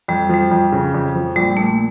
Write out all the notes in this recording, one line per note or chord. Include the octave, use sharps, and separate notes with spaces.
F2 G3
F3 G3
F2
C#3
F2
F3
A#1 G3
A#2 A3